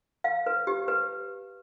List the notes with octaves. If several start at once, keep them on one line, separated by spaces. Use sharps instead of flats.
F5
B4
G4
B4